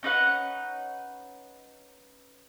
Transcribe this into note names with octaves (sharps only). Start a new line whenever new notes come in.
C#4 D#4 B4 F#5